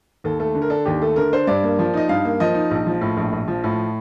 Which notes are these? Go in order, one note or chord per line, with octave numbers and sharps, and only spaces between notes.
D#2 A4
A3 A4
D3
A#4
D4 A4
D#2 G4
A3 A4
D3 A#4
D4 C5
G2 D5
A#3
F3
D#4 D#5
G2 F5
A#3
F3 D#5
D#4
A#1
F3
A2
A#1
A#1
F3
A2